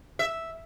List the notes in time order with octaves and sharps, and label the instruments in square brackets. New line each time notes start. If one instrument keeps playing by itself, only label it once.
[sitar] E5